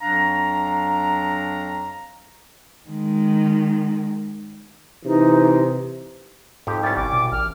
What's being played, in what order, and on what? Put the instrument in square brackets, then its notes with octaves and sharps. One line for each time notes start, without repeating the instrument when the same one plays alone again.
[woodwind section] F2 F#3 D4 F5 A#5
[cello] D#3 G#3
[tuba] C3 [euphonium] E3 [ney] D#4
[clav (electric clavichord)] F2 G4 [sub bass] G#2
[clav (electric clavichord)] C2 G3 C#4 [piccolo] A6
[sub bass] G#1 [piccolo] D6
[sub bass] B2
[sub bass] A1 [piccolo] F6